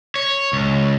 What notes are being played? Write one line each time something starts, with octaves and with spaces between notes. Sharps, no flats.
C#5
C#2